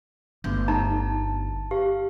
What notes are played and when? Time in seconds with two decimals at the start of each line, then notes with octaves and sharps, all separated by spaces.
0.44 G1 A3 B3 G6
0.68 D#4 A5 A#5
1.71 G4 F5